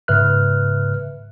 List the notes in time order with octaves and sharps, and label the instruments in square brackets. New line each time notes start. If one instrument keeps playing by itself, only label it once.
[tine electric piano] G#2 C#3 B4 E5 F6 F#6